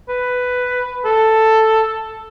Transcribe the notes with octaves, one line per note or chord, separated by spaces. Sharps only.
B4
A4